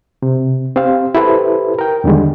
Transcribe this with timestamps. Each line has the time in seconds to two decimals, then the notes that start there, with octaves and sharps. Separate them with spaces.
0.22 C3
0.76 C4 G4 C5 F5
1.15 E4 G4 A4 B4 C5
1.79 A#4 G5
2.04 E2 D3 D#3 G3 G#3